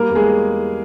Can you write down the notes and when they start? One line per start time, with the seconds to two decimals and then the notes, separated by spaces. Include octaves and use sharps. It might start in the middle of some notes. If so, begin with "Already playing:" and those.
Already playing: G3 A#3 A#4
0.10 E2
0.15 G#3 G#4